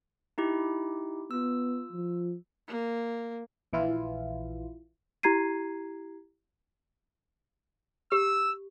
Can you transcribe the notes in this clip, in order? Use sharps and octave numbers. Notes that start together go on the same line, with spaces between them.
D#4 E4 G4
B3 F4 E6
F3
A#3
A#1 E3 E4 F4
E4 G4 A#5 G#6 C7 D#7
G4 E6